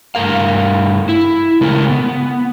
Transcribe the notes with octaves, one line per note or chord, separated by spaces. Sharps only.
G2 A3 A#4 F5
E4
C#3 G#3 A3 A#4
B3